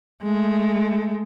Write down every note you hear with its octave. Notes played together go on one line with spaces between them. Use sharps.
G#3 A3